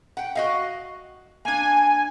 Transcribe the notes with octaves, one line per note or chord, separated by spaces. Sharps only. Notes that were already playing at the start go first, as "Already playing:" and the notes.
F#5 G5
F#4 D#5 F5
A#3 D4 G#5